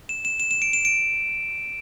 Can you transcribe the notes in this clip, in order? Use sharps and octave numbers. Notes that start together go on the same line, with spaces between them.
E7
E7
E7
E7
D7
E7
D7